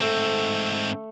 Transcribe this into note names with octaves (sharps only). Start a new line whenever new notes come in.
G#2 A3 C4